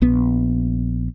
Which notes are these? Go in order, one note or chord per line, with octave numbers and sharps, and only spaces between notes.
A#1 B3